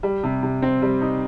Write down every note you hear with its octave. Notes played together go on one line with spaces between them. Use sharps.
G3
C3
C3
C4
G3
D#4